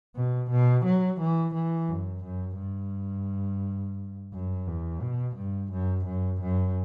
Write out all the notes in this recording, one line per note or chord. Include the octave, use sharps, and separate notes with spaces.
B2
B2
F#3
E3
E3
F#2
F#2
G2
F#2
E2
B2
G2
F#2
F#2
F#2